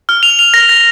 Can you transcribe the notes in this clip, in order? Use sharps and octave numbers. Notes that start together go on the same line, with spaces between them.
F6
F7
F7
A#6
A#6